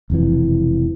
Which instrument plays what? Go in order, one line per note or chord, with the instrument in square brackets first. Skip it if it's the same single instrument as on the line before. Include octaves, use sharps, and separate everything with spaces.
[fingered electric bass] E1 F2 C3 E3